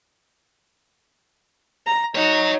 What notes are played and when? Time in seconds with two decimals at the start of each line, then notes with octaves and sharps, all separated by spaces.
1.86 A#5
2.15 D#4 F#4 C#5